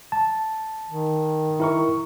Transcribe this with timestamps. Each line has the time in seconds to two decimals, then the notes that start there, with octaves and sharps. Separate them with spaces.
0.12 A5
0.89 D#3
1.60 E4 A#4 C#6